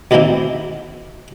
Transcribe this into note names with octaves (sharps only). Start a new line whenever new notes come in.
D2 B2 D#3 E3 A#3 C4